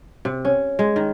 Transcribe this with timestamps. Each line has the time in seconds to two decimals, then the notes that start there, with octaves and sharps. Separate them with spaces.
0.25 C3
0.45 C#4
0.79 G#3
0.96 D#3